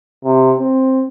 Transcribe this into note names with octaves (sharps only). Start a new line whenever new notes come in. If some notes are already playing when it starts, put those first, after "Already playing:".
C3
C4